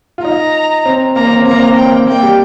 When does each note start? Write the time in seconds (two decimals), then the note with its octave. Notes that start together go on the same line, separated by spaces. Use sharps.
0.18 F4
0.25 D#4 A#5
0.85 C4
1.16 A#3 A#5
1.25 C4
1.33 A#3
1.42 C4
1.47 A#3 A#5
1.60 C4
1.69 A#3
1.76 C4 G5
1.87 A#3
2.07 A#3 G5
2.23 G3